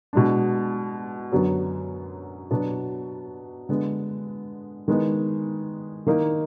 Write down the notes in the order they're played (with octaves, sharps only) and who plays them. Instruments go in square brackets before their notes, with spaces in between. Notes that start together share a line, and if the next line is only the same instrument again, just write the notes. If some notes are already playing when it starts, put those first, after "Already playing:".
[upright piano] B2 G#3 D4
F#2 D3 F#3 B3
B2 F#3 B3 D4
D3 G#3 B3
D#3 G#3 B3
D#3 A#3 D#4